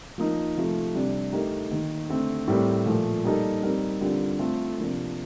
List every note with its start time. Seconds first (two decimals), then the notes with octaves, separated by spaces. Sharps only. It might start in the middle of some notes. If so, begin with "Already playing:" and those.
0.18 F3 A#3 D#4
0.56 C3 F3 A3
0.94 C3 G3 D4
1.32 A3 D#4 G4 A#4
1.71 D#3 A#3 D#4 A#4
2.09 D3 A3 C4
2.47 A2 G3 C4 G4 A#4
2.86 A#2 F3 A3
3.24 G3 A#3 D#4 A4
3.63 G3 C4 D#4 A#4
4.01 D3 G3 C4 F4 A#4
4.39 A3 C4 F4 A4
4.78 C3 F3 A#3 D4